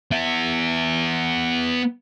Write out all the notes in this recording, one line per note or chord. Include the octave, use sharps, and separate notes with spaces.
B3 E5